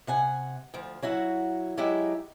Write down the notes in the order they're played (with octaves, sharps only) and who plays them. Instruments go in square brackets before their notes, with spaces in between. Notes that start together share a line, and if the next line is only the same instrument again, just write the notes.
[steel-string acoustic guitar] C3 F#5 G#5
D2 F3
F#3 E4 F#4 F#5
F#3 G#3 E4 G4